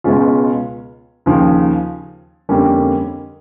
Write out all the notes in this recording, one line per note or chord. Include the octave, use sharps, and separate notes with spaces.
C#2 B2 G#3 C#4 F4
D#2 C#3 F3
F2 D3 G3 A#3 C#4